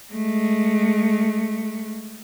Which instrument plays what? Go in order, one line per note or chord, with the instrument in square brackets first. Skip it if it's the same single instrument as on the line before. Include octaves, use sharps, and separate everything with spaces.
[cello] G#3 A3